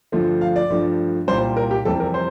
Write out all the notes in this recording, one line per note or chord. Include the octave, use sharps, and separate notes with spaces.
G2 D3 F3 A3
F5
D5
G2 F3 A3
C2 A#2 G3 C5
A#4
G4
F2 C3 E3 G3 A4
A#4
C5